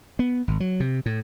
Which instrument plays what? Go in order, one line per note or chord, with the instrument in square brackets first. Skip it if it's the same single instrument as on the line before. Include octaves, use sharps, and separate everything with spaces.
[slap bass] B3
G#1
F#3
C3
A2